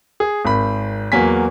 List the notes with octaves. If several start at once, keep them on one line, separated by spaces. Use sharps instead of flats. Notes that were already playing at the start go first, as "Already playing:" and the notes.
G#4
G#1 B5
E2 F#3 A#3 G#5 B6